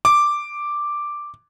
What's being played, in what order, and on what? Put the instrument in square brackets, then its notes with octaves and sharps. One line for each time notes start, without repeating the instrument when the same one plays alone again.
[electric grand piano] D6